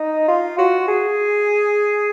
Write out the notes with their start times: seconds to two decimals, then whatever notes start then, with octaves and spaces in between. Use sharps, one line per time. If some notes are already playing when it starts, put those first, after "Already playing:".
Already playing: D#4
0.28 F4
0.58 F#4
0.88 G#4